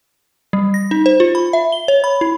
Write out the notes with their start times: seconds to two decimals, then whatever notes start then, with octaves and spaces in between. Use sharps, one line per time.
0.53 G3
0.74 A#6
0.91 D#4
1.06 C5
1.20 F4
1.35 B5
1.53 E5
1.72 G7
1.88 C#5
2.04 B5
2.21 E4